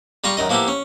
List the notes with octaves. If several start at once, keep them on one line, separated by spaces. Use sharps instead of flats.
G3 F4 A#5 C6 C#6
F#2 D#3 D#5
F3 A#3 B3 E4 G4
C#4